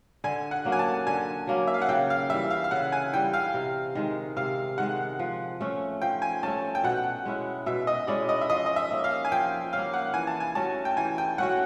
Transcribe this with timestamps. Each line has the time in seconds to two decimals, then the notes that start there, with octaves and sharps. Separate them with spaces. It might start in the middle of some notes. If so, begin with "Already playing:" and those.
0.24 D3 G#5
0.51 F#5
0.65 F#3 A#3 C#4
0.72 G#5
0.79 A5
1.07 D3 G#5
1.47 F#3 A#3 C#4
1.67 E5
1.74 F5
1.82 F#5
1.89 C#3 G5
2.10 F5
2.30 E3 G3 E5
2.50 F5
2.64 F5
2.71 C#3 F#5
2.92 G#5
3.13 E3 G3 G5
3.34 F5
3.54 C3
3.95 D#3 G#3
4.36 C3 F5
4.78 D#3 G#3 F#5
5.19 F3
5.61 A3 C#4
6.02 F3 G5
6.22 G#5
6.43 A3 C#4 A5
6.75 G5
6.84 B2 F#5
7.25 G#3 C#4 E4
7.66 B2 E5
7.87 D#5
8.07 G#3 C#4 E4 D5
8.29 D#5
8.41 E5
8.50 F3 D#5
8.66 D#5
8.76 E5
8.91 A#3 C#4
9.04 F5
9.25 G#5
9.32 F3 G5
9.73 A#3 C#4 F5
9.94 F#5
10.14 E3 G#5
10.27 A5
10.40 G#5
10.55 A3 C#4 F#4 A5
10.85 G5
10.97 E3 G#5
11.18 G5
11.38 A3 C#4 F#4 F#5